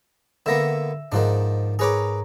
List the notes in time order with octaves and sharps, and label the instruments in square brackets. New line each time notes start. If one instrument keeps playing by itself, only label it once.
[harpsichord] D3 A#3 B3 [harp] E5 A#6
[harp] G#2 [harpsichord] D#3 F3 D4
[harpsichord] G#4 B4 D6 [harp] A#4 C#5 A#5